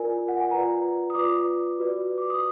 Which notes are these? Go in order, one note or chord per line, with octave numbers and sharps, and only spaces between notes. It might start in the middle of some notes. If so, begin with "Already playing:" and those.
Already playing: F4 A#4 D5 G#5
F#5
G#5
F4 B4 D5 A#5
D#6
F4 B4 D5 D6
F#4 B4 D5
D6
D#6